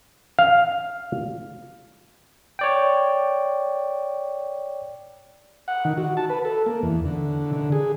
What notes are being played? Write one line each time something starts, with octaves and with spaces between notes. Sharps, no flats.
F5
C#5 D5 G5
F#5
D#3
F#4
A5
B4
A4
A#3
E2
D3
D3
G#4